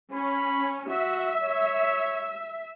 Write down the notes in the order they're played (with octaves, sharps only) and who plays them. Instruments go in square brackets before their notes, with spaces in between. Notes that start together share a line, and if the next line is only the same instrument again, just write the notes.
[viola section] C#4 [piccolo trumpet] B5
[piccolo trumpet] F#4 [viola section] E5
[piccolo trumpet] C#5